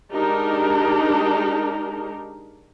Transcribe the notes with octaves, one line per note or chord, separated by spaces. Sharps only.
G#3 D4 D#4 G4 A#4